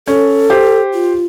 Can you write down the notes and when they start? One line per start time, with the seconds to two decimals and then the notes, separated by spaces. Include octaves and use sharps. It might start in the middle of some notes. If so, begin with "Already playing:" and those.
0.07 C#4 A4
0.50 G4 C5
0.94 F4